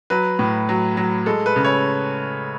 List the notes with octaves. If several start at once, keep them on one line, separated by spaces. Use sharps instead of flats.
F#3 B4
A2
F#3
F#3
G#3 A4
B4
C#3
C#5